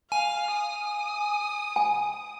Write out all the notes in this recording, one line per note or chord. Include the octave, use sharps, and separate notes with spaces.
F5 G#5
D#6
G#5